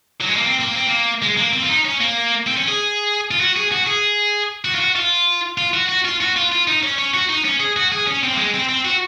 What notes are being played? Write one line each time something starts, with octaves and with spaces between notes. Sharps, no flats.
F#3
G#3
A#3
C4
A#3
C4
A#3
G#3
A#3
C4
F4
D#4
C#4
A#3
C4
C#4
G#4
F4
F#4
G#4
F#4
G#4
F#4
F4
F#4
F4
F4
F#4
F#4
F4
F#4
F4
F4
D#4
C#4
C#4
F#4
D#4
C#4
G#4
F#4
G#4
C#4
C4
A#3
G#3
C4
C4
F#4